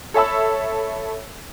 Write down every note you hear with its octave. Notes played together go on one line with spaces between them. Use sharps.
A4 C#5 E5 A5 B5 E6